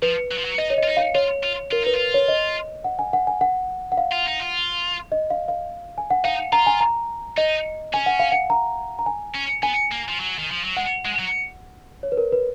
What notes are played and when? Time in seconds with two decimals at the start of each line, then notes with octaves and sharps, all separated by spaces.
0.02 F3 B4
0.31 F#3
0.38 F3
0.45 F#3
0.58 D#4 D#5
0.70 C#5
0.78 D#5
0.83 F4
0.87 D#4
0.97 F5
1.15 F4 C#5
1.44 F4
1.71 F4 A#4
1.83 D#4 B4
1.94 F4
2.14 C#5
2.28 D#5
2.84 F#5
2.99 G#5
3.13 F#5
3.27 G#5
3.41 F#5
3.92 F#5
3.97 F5
4.12 F4
4.26 D#4
4.40 F4
5.12 D#5
5.30 F5
5.48 F5
5.98 G#5
6.10 F#5
6.24 D#4 F5
6.53 F4 A#5
6.66 G#5
6.81 A#5
7.37 D#4 D#5
7.93 C#4 G#5
8.06 F#5
8.20 F5
8.32 F#5
8.50 A#5
8.99 A#5
9.06 G#5
9.35 C#4
9.63 B3 G#5
9.92 A#3
10.09 F3
10.20 F#3
10.39 D#3
10.51 F3
10.64 F#3
10.76 G#3 F#5
11.05 G#3
11.19 F#3
12.03 C#5
12.12 B4
12.17 A#4
12.32 B4